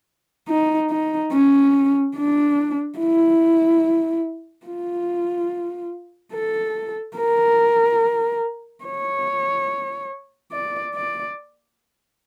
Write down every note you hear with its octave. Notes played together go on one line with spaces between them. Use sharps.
D#4
D#4
C#4
D4
E4
F4
A4
A#4
C#5
D5
D5